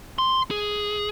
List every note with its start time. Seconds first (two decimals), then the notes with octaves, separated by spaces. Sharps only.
0.18 C6
0.51 G#4